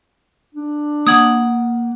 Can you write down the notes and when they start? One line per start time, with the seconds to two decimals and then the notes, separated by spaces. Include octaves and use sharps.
0.54 D4
1.07 A#3 F#5 D#6 G#6